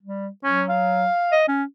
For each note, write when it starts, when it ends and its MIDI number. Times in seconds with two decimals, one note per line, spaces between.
0.03 0.29 55
0.44 1.07 54
0.44 0.63 61
0.69 1.36 77
1.32 1.44 75
1.48 1.64 61